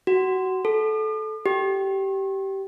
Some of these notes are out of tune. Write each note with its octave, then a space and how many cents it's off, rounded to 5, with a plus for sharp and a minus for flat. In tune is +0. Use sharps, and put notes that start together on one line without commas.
F#4 +20
A4 -20
G4 -15